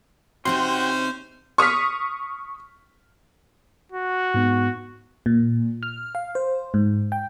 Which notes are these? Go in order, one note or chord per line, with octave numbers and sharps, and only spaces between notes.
C3 C4 C#4 D#4 F#4 C5 G5 C6
C#6 D#6 F6 B6
F#4
G#2 B3
A#2
F6
F5
C5
G#2
G5